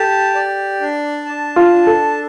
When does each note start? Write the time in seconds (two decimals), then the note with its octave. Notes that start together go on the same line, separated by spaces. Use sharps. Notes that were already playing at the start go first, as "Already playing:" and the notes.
Already playing: G4 A4 A5
0.35 D5
0.81 D4
1.25 A5
1.56 F4
1.71 D4
1.87 A4